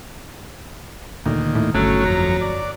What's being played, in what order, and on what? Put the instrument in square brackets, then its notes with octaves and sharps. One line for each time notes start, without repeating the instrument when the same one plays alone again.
[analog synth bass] D2 [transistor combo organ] A#2 D#3
[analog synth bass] A2
[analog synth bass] G1 [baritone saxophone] F#3 [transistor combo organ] A3 C#4
[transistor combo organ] F2 A#5
D5